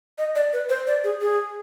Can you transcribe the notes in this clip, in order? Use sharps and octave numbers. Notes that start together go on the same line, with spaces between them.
D#5
D5
B4
C5
D5
G#4
G#4